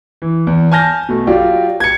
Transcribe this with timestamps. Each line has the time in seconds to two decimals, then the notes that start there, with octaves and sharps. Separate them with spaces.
0.22 E3
0.47 E2
0.72 G#5 A5 F6 G6 A#6
1.09 B2 A3
1.27 F#3 F4 G4 D5
1.80 G#6 C#7